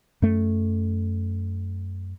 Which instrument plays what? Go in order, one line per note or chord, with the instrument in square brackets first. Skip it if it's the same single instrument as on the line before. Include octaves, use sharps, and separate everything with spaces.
[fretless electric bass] F#2 A3